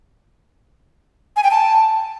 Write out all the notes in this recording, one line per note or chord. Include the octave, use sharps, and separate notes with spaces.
G#5
G5
A5